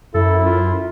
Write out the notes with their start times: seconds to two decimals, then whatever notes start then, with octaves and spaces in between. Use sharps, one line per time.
0.14 F#2 E4 A4
0.46 F4